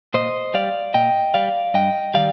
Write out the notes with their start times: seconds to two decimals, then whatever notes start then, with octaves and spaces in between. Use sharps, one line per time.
0.14 A#2 C5 D#5
0.54 G3 D5 F5
0.94 A#2 D#5 G5
1.34 G3 D5 F5
1.74 G2 D#5 G5
2.14 D#3 G3 D5 F5